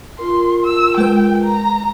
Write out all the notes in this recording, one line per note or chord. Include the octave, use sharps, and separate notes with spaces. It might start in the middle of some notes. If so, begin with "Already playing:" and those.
F4 A#4 C6
E6
G#3 B4 G5
A#5